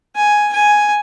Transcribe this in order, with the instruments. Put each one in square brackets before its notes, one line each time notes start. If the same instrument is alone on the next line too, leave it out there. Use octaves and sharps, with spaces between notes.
[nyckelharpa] G#5
G#5